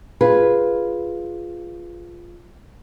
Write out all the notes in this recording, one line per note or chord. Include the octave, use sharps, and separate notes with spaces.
F4 G#4 B4